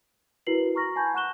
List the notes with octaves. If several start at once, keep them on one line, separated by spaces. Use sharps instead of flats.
E4 F#4 A#4 B4 C7 F#7
A#5 C#6 F6 A#6
G#5 A5 B5 C#6 G6 G#6
F#5 C#6 F#6 E7 G7